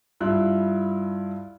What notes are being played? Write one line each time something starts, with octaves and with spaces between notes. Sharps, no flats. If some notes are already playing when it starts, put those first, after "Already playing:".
G2 E4 F4 F#6